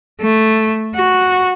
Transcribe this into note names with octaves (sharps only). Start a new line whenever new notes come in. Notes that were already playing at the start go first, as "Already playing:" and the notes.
A3
F#4